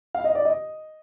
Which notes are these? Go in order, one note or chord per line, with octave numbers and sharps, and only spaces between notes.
F5
D#5
D5
D#5